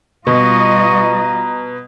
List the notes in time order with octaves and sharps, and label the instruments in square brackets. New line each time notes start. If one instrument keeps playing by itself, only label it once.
[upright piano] B2 [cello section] G3 F4 D#5 [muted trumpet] A#5 [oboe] C#6